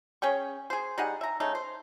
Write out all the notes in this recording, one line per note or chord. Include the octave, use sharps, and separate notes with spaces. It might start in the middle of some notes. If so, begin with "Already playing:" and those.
C#4 G#4 G5 C#6
G#4 C5
G3 D#4 G#4 F#5
E5 A#5
C#3 A3 D#4
C5